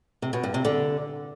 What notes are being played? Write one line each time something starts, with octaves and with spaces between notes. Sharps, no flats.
C3
B2
G2
C3
D3